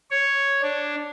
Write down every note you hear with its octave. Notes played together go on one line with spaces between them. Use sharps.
C#5
D4